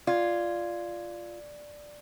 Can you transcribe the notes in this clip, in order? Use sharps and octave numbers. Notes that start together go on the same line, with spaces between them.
F4 D5 G#6